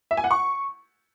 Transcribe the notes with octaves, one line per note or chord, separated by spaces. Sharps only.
E5
G#5
F#5
C#6